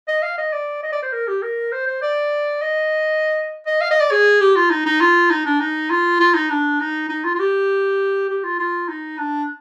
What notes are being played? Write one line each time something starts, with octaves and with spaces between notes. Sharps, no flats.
D#5
F5
D#5
D5
D#5
D5
C5
A#4
G4
A#4
C5
C5
D5
D#5
D#5
F5
D#5
D5
G#4
G4
F4
D#4
D#4
F4
D#4
D4
D#4
F4
F4
D#4
D4
D#4
D#4
F4
F4
G4
G4
F4
F4
D#4
D4